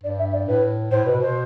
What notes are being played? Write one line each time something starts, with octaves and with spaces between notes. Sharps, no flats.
G2 D5
E5
D5
A2 B4
A2 C5
B2 B4
B2 C5